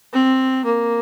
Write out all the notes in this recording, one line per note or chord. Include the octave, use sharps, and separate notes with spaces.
C4
A#3